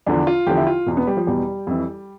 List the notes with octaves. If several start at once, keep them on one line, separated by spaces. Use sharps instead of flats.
E2 D3 F3 D4
F4
E2 D3 F3 G4
E4
F4
E2 B2
B3
G3
F3
E2 B2 G3
F2 E3